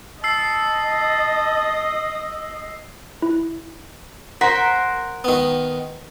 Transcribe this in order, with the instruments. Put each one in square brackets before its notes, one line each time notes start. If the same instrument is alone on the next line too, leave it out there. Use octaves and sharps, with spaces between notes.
[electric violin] D#5 [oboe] A5 [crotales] E6 C7
[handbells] E4
[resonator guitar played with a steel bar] A#4 C5 [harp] F#5 C6 B6
[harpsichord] D#3 B3